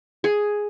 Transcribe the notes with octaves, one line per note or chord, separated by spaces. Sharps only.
G#4